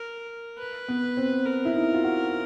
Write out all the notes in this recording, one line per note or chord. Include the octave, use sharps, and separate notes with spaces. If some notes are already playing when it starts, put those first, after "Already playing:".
Already playing: A#4
B4
B3
C4
A#4
E4
D#4
F4
F#4